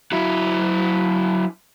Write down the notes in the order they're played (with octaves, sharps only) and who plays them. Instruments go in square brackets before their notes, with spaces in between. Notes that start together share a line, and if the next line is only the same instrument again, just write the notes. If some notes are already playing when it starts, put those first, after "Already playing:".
[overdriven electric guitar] F#3 E4